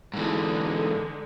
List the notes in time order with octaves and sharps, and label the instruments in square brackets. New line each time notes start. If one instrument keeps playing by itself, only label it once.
[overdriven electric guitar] G#2 E3 [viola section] D3 G#3 D#4